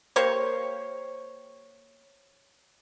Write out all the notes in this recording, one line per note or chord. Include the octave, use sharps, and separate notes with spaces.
A#3 G4 C5 C#5